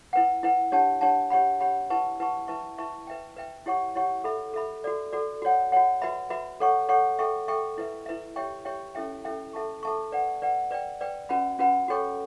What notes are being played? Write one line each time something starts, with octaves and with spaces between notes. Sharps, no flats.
E4 B4 F#5
E4 B4 F#5
D4 G4 C#5 F#5 A5
D4 G4 C#5 F#5 A5
G4 C#5 F#5 B5
G4 C#5 F#5 B5
E4 B4 F#5 A5 C#6
E4 B4 F#5 A5 C#6
E4 B4 E5 A5 C#6
E4 B4 E5 A5 C#6
B4 E5 G5
B4 E5 G5
E4 G4 C#5 F#5 C#6
E4 G4 C#5 F#5 C#6
A4 E5 B5
A4 E5 B5
F#4 A4 D5
F#4 A4 D5
F#4 C#5 F#5
F#4 C#5 F#5
F#4 B4 E5 B5
F#4 B4 E5 B5
A4 C#5 F#5 C#6
A4 C#5 F#5 C#6
A4 E5 G5 C#6
A4 E5 G5 C#6
E4 B4 E5
E4 B4 E5
G4 C#5 E5 G5 C#6
G4 C#5 E5 G5 C#6
C#4 E4 A4 E5 G5
C#4 E4 A4 E5 G5
A4 E5 A5 C#6
A4 E5 A5 C#6
B4 D5 F#5
B4 D5 F#5
B4 D5 G5
B4 D5 G5
C#4 F#4 B4 F#5 B5
C#4 F#4 B4 F#5 B5
F#4 A4 C#5 G5 C#6